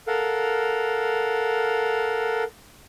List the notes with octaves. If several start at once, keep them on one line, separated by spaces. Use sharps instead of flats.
A4 A#4 F5 F#5